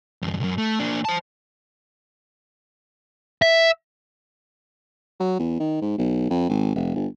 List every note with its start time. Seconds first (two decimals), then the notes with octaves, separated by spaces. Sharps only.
0.22 E2 G2
0.40 C2 F#2
0.58 A3
0.80 A#3 D4
1.05 C5 A5
3.42 E5
5.20 F#3
5.39 E2
5.60 D#3
5.81 G#2
5.98 B1
6.30 F2
6.49 G#1
6.75 F1
6.96 G1